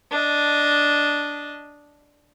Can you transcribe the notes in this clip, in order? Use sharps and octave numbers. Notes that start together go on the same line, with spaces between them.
D4 D#5